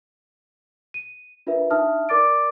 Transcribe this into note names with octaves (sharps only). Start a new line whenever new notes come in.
D#7
D4 F4 A#4 B4 E5
D4 D#4 E5 A5 D#6 F6
A#4 D5 D6 A6 D7